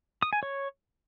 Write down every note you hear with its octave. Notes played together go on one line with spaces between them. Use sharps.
D#6
G#5
C#5